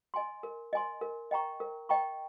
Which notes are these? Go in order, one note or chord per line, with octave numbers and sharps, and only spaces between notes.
D#5 G#5 C6
A#4
D#5 G#5 C6
A#4
D#5 G5 A#5 C#6
A#4
D#5 G5 A#5 C#6